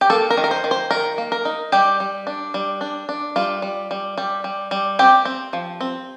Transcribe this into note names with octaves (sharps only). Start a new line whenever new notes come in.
G4
A#3 A4
A#4
D#3
A#4
C5
D#3
C5
D#3 A#4
A#3
A#4
D#4
G3 G4
G3
D4
G3
D4
D4
G3 F4
G3
G3
G3
G3
G3
C4 G4
C4
F3
C4